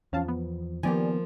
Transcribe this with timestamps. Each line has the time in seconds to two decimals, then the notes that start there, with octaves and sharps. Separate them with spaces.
0.13 E2 F3 C#4 F5 A5
0.28 B3
0.83 D#3 F3 A#3 B3 G4 D5 G#5